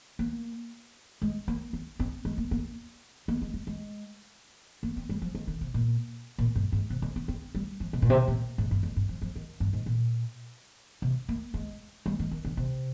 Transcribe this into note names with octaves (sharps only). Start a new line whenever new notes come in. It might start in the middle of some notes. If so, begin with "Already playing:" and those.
A#3
G#3
A#3
C4
C4
G#3
A#3
A#3
A#3
G#3
G3
G#3
A#3
C4
G3
F3
D#3
D3
C3
A#2
A#2
G2
G#2
C3
D3
C4
C4
G3
F3
C3
A#2
C3
A#2
G#2
G2
F2
G2
F3
F3
D#3
G2
G#2
A#2
C3
A#3
G#3
G3
D#3
D#3
D3
C3